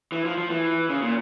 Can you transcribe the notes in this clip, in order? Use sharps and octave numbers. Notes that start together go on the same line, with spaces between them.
E3
F3
F3
E3
C#3
A#2